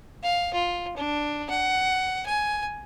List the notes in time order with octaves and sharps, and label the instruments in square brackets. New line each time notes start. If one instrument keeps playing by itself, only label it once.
[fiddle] F5
F4
D4
F#5
G#5